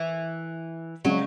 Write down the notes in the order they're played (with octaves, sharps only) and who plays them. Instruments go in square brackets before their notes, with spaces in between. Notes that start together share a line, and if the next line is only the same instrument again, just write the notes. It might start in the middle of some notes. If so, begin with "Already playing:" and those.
Already playing: [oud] E3
[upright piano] C#3 G#3 [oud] F#3